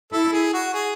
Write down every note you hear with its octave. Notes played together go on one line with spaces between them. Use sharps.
E4 A4
G#4
F#4
G#4